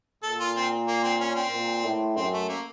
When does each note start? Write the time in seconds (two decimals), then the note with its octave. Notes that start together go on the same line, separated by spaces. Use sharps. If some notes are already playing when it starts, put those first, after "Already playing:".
0.23 A#2 A4
0.40 F4
0.56 C4
0.87 A#3
1.03 C4
1.20 C#4
1.36 C4
1.52 A#2
1.85 A2
2.16 F#2 C4
2.33 A3
2.49 A#3